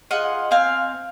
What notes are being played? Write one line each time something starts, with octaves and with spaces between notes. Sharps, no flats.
F4 G#4 D#5 F#5
C4 F5 G#5